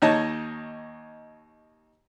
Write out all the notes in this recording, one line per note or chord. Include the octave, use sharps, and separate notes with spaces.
D#2 D#4 C#5 D#5 A5